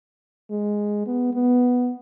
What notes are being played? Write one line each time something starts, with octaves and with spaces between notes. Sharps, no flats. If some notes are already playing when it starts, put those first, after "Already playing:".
G#3
B3
B3